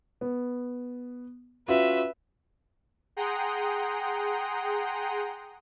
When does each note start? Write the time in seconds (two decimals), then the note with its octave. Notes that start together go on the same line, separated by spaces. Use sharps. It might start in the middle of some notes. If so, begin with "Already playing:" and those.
0.21 B3
1.68 C#4 F4 F#4 B4 E5
3.16 G#4 F#5 G5 A#5 C6 D#6